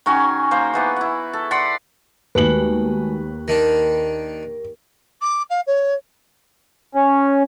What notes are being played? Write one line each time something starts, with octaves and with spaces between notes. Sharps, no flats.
D#3 C#4 F#4 G#5
A#3 C5
E3 B3 F#5
E4 F#5
A4
D5 F#5 B5 C6
D#2 G#3 A3 F#4 B4 F#7
D#3 D4 A#4
D6
F5
C#5
C#4